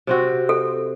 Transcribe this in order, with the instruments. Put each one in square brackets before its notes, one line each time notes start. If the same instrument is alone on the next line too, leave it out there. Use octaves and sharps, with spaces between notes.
[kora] C3 C4 F#4
[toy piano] A4